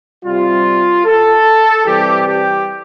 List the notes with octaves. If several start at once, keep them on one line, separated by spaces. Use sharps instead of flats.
C3 G3 F4
A4
C3 E3 G3 G4
G4